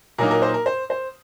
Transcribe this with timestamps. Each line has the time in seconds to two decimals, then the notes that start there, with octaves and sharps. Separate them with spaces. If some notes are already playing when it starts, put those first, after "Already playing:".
0.18 A#2 F#3 A#3 D#4 A#4
0.31 A#4
0.42 C5
0.54 A#4
0.66 C5
0.90 C5